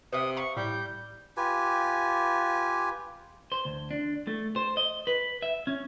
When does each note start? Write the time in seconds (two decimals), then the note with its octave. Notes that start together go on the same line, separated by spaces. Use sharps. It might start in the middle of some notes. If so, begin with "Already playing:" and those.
0.13 C3 B4 E5 D#6
0.37 E5 F5 A#5 C#6
0.57 A2 G3 G6
1.37 F4 G4 B4 G#5
3.52 C5
3.65 D2
3.91 D4
4.27 A3
4.56 C5
4.77 D#5
5.07 B4
5.42 E5
5.67 C#4